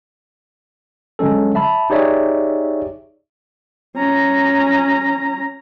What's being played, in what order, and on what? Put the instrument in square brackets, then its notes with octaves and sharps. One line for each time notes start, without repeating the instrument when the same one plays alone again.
[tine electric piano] D3 F#3 G#3 C#4 A4
E5 A5 B5
D#4 G4 G#4 C#5 D5 E5
[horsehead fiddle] C#4 A#5